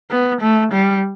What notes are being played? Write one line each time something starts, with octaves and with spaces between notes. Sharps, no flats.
B3
A3
G3